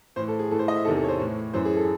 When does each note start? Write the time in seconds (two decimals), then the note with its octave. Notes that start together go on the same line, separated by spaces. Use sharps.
0.16 A2 E3 C5
0.28 A4
0.39 G#4
0.51 A2 E3 A4
0.59 C5
0.68 D#5
0.76 E5
0.85 E2 C3 D#3 A4
0.97 A4
1.04 C#5
1.08 C5
1.20 A2 E3
1.53 F#2 E3 C5
1.65 G#4
1.76 A4